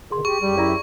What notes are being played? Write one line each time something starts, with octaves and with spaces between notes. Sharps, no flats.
B2 D3 D#3 G#4 C6
G4 G#4 C#6
F#2 G3 G4
E4 D5 E5 A#5